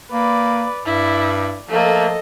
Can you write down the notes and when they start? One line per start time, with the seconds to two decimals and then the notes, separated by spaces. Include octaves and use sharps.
0.12 A#3 B4 D5
0.85 G2 E4 D5
1.69 F3 A3 A#3 A4 D#5